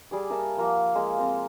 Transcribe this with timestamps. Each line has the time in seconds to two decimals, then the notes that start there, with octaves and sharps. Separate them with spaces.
0.11 G3 G#4 D6
0.30 A#3 A#4 E5 A5
0.57 F3 A#3 F#5
0.95 G#3 A#3 F5
1.18 C4 A#5